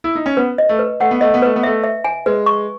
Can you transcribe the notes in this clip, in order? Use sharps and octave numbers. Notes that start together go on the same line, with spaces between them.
E4
D#4
C#4
B3 B4
D#5
A3
B4
A3 F#5
B3
A3 D#5
B3
A3 B4
B3
A3 E5
E5
G#5
G#3 B4
C#6